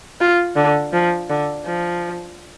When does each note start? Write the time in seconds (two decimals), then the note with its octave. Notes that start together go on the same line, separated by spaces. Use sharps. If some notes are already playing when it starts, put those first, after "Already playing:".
0.21 F4
0.56 D3
0.93 F3
1.30 D3
1.67 F3